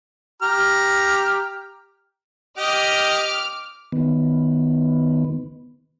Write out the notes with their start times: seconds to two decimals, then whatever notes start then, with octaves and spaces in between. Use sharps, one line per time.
0.42 G4 A#5 F6
2.58 G4 D#5 D6 F6
3.92 D#3 B3